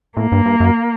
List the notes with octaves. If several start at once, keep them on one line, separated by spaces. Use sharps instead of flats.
A2 A#3
G2
G2
F#2